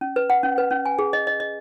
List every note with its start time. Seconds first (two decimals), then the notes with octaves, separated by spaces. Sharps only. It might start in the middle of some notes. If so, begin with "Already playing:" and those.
0.01 C#4
0.16 B4
0.30 F#5
0.43 C#4
0.58 B4
0.71 C#4
0.85 G#5
0.99 G#4
1.13 D#5
1.27 D#5
1.40 D#5